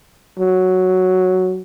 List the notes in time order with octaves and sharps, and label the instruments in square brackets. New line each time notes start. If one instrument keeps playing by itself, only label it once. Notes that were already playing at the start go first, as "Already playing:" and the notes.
[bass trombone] F#3